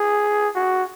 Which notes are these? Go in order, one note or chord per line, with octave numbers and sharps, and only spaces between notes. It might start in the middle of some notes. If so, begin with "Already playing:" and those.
Already playing: G#4
F#4